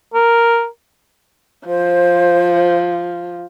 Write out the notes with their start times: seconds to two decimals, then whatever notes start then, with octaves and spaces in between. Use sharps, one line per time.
0.14 A#4
1.67 F3 C5